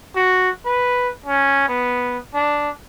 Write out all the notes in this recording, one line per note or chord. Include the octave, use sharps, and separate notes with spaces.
F#4
B4
C#4
B3
D4